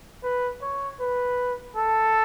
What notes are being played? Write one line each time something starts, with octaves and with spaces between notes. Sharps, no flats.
B4
C#5
B4
A4